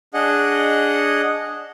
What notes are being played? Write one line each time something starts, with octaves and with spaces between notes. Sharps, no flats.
D4 G#4 D#5 F#5